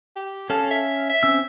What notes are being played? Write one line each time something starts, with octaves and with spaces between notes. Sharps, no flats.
G4
C#4 A4 F5
E5
E5
C4 C#4 E6